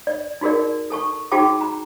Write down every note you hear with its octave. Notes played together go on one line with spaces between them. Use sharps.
D5
D#4 F#4 G#4 A#4 D5
A4 A5 C#6
D#4 F#4 G#4 G5 A5 D6
A#5